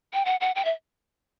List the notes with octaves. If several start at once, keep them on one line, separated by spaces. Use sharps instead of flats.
G5
F#5
F#5
G5
E5